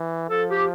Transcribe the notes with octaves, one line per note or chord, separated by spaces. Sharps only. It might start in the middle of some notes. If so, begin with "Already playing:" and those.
Already playing: E3
F3 A4
G4